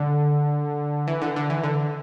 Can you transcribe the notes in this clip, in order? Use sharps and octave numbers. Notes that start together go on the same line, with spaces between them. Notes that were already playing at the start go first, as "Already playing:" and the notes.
Already playing: D3
E3
D3
D3
E3
D3